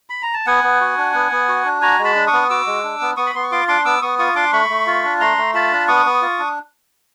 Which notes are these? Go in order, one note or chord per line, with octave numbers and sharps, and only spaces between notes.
B5
A#5
A5
B3 F#5 G#5
B3
F#4
D4
B3
B3
F#4
D4
F#4 G#5 A#5
G#3
A5 B5
D4
C#6 D#6
B3
F#4 D6 E6
G#3
D4
B3
B3 C#6 D#6
B5
B3 C6
C#6
F4 C6 D6
D4 C6 D6
B3 D6 E6
B3 C#6 D#6
F4 C#6 D#6
D4 C6 D6
A3 B5 C#6
A3
F4
D4
A3 A#5 C6
A3
F4 A5 B5
D4
B3 C#6 D#6
B3
F4
D4